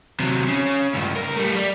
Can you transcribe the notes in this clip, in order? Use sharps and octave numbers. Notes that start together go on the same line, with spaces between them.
C3 F#3
C#3
C#2 G2
D#2 A#4
G3 A3
G3